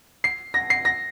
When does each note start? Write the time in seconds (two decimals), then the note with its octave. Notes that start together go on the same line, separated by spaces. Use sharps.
0.24 C7
0.54 A#6
0.70 C7
0.85 A#6